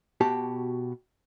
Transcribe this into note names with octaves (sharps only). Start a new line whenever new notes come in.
B2 F#4 G4 A5